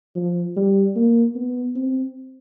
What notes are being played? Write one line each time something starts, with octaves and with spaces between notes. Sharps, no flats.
F3
G3
A#3
B3
C4